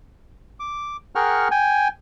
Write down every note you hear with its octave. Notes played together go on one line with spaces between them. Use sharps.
D6
G#4 A#4 F#5 G5 C#6 F6
G5 G#5